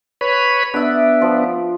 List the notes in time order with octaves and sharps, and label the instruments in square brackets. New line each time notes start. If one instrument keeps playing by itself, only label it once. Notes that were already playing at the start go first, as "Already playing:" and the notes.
[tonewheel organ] B4 C#5 B5
[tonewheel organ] B3 D4 [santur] E5 D#6
[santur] F3 F4 E6